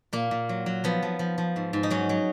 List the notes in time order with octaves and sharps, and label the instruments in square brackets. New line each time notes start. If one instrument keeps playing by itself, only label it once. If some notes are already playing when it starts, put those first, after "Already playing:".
[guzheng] A#2 A#3
A#2
F#3
F#3
F3 B3
F3
F3
F3
G#2
G#2
D#4
F#3 C#4
F#3